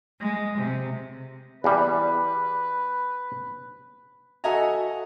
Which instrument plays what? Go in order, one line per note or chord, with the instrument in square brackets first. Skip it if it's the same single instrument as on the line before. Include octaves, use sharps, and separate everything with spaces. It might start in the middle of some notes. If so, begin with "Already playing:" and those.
[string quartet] G#3
C3
[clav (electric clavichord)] E2 G3 [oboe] B4
[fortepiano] F#4 A4 D#5 E5 G#5 A#5